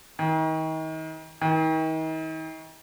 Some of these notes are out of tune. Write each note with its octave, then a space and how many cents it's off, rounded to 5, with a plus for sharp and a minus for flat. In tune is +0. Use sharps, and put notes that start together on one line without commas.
D#3 +35
D#3 +40